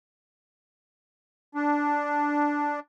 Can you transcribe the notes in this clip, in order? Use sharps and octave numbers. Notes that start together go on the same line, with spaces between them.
D4